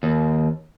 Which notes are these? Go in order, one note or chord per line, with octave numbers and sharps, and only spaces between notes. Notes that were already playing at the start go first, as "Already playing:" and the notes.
D#2